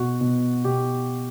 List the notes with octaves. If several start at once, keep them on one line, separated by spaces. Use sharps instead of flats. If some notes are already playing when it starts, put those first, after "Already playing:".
Already playing: B2 F#4
B2
B2 G4